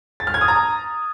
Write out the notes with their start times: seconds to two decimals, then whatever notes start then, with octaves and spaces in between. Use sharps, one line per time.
0.20 A6
0.27 F6
0.34 G#6
0.41 D#6
0.48 A#5